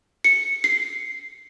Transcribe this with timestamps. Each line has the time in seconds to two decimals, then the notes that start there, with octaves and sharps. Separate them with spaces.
0.24 C#7
0.64 C7